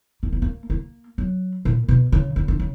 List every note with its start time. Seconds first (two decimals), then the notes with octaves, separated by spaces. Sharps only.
0.23 A#3
0.32 B3
0.42 A#3
0.70 A#3
1.18 F#3
1.65 A#2
1.88 B2
2.12 C#3
2.36 C#3
2.48 D3
2.59 C#3